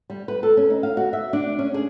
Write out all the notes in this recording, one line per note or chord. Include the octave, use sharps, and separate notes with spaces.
G3
B4
A4
C#4
D#4
F5
F#4
E5
D4
C#4
G#4